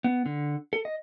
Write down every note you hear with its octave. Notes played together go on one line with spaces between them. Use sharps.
B3
D3
A4
D#5